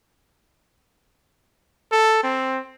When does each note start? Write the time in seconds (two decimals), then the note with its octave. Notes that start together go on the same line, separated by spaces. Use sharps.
1.92 A4
2.23 C4